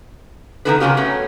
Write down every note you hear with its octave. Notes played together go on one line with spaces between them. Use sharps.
D#3 B3 C#4 E4 A4 B4
C#3 F#3 A#3 C#4 F4 G4
F#3 A3 B3 C#4